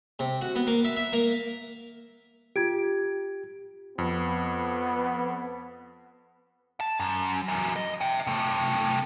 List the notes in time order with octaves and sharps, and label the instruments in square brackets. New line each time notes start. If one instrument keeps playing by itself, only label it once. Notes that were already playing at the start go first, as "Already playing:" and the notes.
[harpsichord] C3
F#4
B3
A#3
E5
E5
A#3
[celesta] F4 G#6 D7 [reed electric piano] G4
[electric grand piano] F2 [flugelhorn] B3
[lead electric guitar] A5
F#2
E3 F#3
D#5
E5 G5
C3 A3